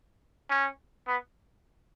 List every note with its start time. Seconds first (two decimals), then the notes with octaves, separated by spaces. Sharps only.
0.50 C#4
1.07 B3